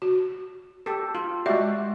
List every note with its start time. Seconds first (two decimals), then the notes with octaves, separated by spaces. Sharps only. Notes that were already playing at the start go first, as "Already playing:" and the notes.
0.02 F#4
0.86 G4 A4
1.15 F4
1.46 G#3 F#4 G4 D5 E5